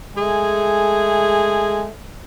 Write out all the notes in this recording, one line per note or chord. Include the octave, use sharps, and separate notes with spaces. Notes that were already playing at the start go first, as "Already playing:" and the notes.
G#3 A3 G#4